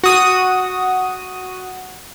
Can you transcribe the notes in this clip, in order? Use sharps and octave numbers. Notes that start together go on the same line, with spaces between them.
F#4 D#6